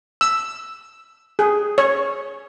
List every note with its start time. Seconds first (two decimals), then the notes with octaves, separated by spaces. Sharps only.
0.21 E6
1.39 G#4
1.78 C#5